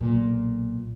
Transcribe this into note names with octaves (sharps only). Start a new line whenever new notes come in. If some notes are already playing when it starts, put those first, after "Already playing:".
B1 A#2